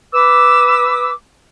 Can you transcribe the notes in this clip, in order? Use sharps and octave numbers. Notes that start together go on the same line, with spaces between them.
B4 D6 E6